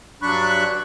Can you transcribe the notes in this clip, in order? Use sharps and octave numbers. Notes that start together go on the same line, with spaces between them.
G2 F#3 D4 B5 C#6 F#6